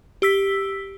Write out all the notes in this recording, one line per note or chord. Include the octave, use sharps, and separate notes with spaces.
G4 E6 B6